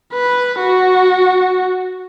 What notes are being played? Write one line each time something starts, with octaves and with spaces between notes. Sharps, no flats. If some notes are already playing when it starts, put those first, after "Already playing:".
B4
F#4